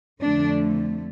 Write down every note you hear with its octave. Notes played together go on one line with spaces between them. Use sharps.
F2 D3 A3 D4